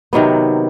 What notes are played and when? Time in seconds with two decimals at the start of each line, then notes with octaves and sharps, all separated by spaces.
0.13 C3 D#3 F#3 B3